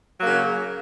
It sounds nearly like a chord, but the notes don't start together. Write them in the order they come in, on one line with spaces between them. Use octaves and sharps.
F#3 A#3 C#3